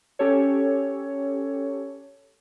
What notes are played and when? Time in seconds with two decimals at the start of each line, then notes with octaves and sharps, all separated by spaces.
0.19 C#4 G4 A4 C#5